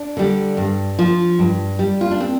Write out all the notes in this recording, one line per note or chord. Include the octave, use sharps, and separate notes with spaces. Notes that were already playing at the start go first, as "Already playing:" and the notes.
Already playing: D4
D3 G3
G2
F3
G2
G3
F4
D4
C4